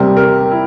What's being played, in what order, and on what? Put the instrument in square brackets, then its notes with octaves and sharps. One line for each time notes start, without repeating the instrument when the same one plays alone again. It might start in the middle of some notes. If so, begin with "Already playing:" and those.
Already playing: [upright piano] C3 G3 C4 G4 [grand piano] A#4
[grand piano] A#4
E4